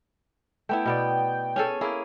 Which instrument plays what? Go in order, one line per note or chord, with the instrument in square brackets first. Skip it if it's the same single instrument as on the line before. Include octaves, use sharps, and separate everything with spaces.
[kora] A3 B3 E4 [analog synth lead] G5
[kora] B2 B3 D5
C#4 G#4 A4
A#3 E4 G#4